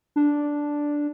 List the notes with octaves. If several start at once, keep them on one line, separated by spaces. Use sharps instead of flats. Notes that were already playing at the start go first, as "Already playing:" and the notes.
D4